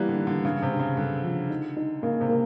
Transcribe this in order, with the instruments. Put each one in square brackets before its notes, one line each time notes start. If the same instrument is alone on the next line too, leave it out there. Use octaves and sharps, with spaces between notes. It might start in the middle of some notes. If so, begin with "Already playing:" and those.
Already playing: [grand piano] E3 A#3 B3 [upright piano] G3
[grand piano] D3
[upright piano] D#3
[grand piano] D3
[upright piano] G2 [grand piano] C#3
[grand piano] C3
[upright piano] G2
[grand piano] C#3
[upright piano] G2 [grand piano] D3
[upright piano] F3
D#4
D#4
[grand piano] C#3 [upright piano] A#3
[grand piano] C3
[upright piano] A#3